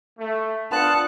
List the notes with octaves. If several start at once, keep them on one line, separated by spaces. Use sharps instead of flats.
A3
B3 D4 F4 A5 F#6 C#7